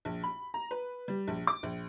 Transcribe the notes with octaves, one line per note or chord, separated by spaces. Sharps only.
A#1
B5
A#5
B4
G3
A#1
D6
A#1